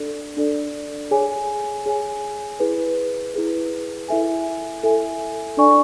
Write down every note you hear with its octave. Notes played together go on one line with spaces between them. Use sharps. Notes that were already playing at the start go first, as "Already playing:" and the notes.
Already playing: D4 A4 D5
D4 A4 D5
G#4 C#5 G#5
G#4 C#5 G#5
E4 G#4 B4
E4 G#4 B4
E4 A4 E5 G#5
E4 A4 E5 G#5
D4 A4 D5 G#5 C#6